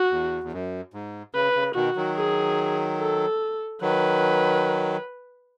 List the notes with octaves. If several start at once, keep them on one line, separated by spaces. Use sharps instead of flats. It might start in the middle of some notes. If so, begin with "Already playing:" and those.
Already playing: F#4
E2
E2
F#2
G#2
C#3 B4
C#3
B2 D#3 F#4
D#3 F#3
G#4
A4
D#3 F#3 B4